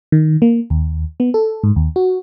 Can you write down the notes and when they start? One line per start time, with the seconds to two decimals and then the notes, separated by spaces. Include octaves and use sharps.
0.12 D#3
0.42 A#3
0.70 D#2
1.20 B3
1.34 A4
1.64 G#2
1.76 D#2
1.96 F#4